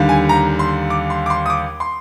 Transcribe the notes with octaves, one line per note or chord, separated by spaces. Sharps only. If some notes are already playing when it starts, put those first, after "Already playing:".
Already playing: D#2 D3 G3
G#5
A#5
C6
D6
C6
D6
C6
D#6
D6
C6